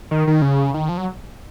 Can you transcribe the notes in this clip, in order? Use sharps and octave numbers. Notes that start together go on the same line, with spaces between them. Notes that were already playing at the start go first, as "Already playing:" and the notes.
D#3
D#3
C#3
D#3
F3
F#3